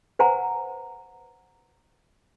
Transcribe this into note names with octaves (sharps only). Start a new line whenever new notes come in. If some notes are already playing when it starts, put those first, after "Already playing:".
B4 C5 F#5 G#5 A#5